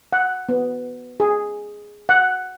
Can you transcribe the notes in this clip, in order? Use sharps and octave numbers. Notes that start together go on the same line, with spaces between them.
F#5
B3
G#4
F#5